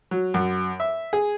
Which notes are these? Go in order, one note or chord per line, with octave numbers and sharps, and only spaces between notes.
F#3
F#2
E5
G#4